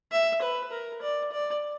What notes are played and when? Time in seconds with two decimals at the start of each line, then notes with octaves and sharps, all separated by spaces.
0.12 E5
0.42 B4
0.72 A#4
1.02 D5
1.32 D5